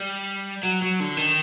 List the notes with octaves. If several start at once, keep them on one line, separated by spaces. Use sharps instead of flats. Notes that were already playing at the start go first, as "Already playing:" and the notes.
Already playing: G3
F#3
F#3
D3
D#3